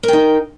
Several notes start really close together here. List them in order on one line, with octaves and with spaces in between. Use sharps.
A#4 G5 D#4